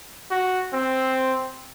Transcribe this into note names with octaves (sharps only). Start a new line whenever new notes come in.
F#4
C4